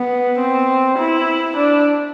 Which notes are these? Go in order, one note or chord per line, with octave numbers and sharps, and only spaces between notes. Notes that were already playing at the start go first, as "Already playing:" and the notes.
Already playing: B3
C4
E4
D4